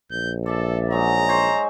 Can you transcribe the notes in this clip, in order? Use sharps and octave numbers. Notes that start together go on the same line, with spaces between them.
A#1 G6
A4 D5 E5 A5
F#3 G#3 D#4 A#5
C5 C#5